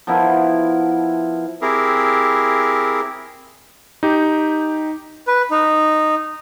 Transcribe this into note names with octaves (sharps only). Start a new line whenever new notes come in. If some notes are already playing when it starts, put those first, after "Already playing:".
F3 B3 E4 A#4
C4 E4 G4 G#4 A#4
D#4 G4
B4
D#4